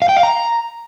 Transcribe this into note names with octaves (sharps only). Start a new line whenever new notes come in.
F5
G5
F5
A#5